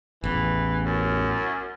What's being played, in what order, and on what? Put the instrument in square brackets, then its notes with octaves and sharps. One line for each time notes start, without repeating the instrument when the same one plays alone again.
[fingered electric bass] A1 E2 [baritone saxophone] E3
[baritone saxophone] F#2